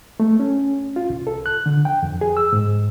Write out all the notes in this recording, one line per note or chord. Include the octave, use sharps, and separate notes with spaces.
A3
C#4
F4
C2
A4
F#6
D3
G5
F2
G#4
E6
G#2